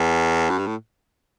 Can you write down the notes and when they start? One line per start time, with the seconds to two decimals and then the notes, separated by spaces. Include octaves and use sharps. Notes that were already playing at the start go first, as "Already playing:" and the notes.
Already playing: E2
0.50 F#2
0.58 G2
0.67 A2